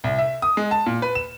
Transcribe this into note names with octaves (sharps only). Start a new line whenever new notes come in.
C2
E5
D#6
G#3
A5
A#2
B4
E7